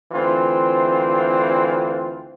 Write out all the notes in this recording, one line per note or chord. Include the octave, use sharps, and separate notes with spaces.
D2 E3 C4 F4